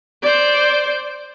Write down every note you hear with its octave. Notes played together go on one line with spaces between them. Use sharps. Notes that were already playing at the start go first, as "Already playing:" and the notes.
C5 D5